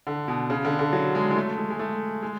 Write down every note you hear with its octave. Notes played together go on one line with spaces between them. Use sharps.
D3
B2
C#3
D3
D3
F#3
G#3
G#3
A3
G#3
G#3
A3
G#3